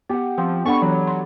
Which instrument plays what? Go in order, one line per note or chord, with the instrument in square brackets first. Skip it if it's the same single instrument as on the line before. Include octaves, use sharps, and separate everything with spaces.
[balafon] B3 [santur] G4 F#5
[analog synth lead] F3 [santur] C4
[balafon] B3 D4 F#5 [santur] A4 D5 B5 [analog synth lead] C#6
[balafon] E3 [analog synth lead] F#3
[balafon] C6